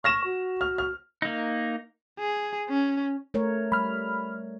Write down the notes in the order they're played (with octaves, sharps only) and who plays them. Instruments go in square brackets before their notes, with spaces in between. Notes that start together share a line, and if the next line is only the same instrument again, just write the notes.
[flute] C#6 [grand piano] F6 A#6 E7
[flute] F#4
[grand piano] F6
F6
[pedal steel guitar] A#3 D#4
[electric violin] G#4
C#4
[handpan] A3 A#4 C#5
[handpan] G3 [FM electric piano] B5 F6